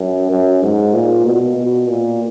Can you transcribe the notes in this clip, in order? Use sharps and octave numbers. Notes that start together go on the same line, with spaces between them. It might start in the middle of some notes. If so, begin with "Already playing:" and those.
Already playing: F#2
F#2
G#2
A#2
B2
B2
A#2